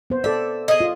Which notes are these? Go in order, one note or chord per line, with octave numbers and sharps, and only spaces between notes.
B3 C5
A4 D5 E5
G#4 D#5
F4